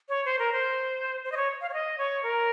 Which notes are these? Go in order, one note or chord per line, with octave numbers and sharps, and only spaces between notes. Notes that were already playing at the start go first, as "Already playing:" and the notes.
C#5
C5
A#4
C5
C5
D#5
C#5
F5
C#5
D#5
C#5
A#4